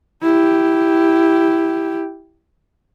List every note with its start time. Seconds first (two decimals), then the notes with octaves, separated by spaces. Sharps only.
0.23 E4 G4